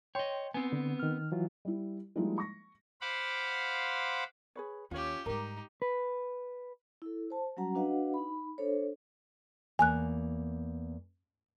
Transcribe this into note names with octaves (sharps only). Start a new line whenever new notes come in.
C#5 D#5 G5 C6
B3 C4 G#5
D3
D#3 F6
E3 F#3 F4
G3 E4
F3 G3 G#3 A#3 D#4 E4
C#6 A#6
C5 F5 F#5 B5 D6
G#4 B4 C#5
D#2 C#4 F4 G4 C#5
G#2 G3 D#4 G4 A#4
B4
E4 A4
C5 A5
F#3 G3 C#4 F#4 F#5 A#5
D4 F#4 B4 D#5 F5 F#5
D#4 B5
D4 A4 C5 C#5
E2 A#3 G#5 F#6